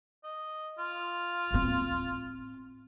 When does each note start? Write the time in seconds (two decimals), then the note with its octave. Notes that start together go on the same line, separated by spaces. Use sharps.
0.23 D#5
0.78 F4
1.51 A2 C4